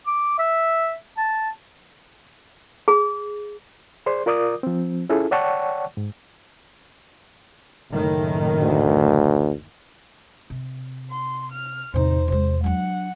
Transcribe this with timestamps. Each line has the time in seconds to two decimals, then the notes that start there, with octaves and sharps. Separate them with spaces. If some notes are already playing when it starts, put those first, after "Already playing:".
0.07 D6
0.39 E5
1.17 A5
2.88 G#4
4.06 G#4 C5 D5 C6
4.26 F4 A#4 D5 D6 D#6
4.63 F3 C4
5.09 C#4 E4 F4 G#4 A4
5.31 C#5 D5 F#5 G5 A5 C#6
5.97 G#2
7.90 F#1 A2 D#3
8.62 D2
10.50 C3
11.10 C6
11.52 F6
11.94 E2 A2 C3 D#4 C5
12.28 C3 G#3 C5
12.64 F#3 D4 F#5